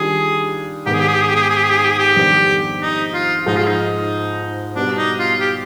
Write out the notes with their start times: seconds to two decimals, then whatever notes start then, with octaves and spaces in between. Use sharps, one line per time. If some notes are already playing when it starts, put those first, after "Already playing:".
Already playing: D#3 G3 D4 F4 G#4
0.86 G#2 D#3 B3 G4
0.94 G#4
1.00 G4
1.08 G#4
1.14 G4
1.22 G#4
1.28 G4
1.35 G#4
1.42 G4
1.50 G#4
1.57 G4
1.64 G#4
1.70 G4
1.77 G#4
1.84 G4
1.91 G#4
1.98 G4
2.16 F2 D#3 G3 B3 D4
2.82 D#4
3.13 F4
3.46 G#2 F3 G#3 D#4
3.56 F4
3.67 D#4
4.75 B2 G3 B3 D4
4.97 D#4
5.19 F4
5.40 G4